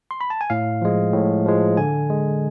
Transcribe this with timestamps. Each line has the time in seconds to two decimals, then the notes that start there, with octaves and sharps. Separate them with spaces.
0.11 C6
0.21 B5
0.30 A5
0.41 G#5
0.50 A2 F5
0.82 F3 G#3
1.13 A2
1.46 F3 G#3
1.77 D3 G#5
2.10 G#3